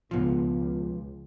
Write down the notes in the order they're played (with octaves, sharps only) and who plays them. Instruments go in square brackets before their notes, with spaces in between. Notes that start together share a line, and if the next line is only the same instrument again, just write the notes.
[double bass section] C#2 [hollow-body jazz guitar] B2 F3